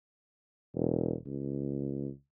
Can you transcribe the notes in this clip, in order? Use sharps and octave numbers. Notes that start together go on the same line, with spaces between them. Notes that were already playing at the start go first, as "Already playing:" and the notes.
E1
C#2